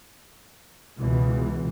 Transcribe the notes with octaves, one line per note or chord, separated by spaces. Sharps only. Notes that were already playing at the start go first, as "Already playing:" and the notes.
C#2 B2 E3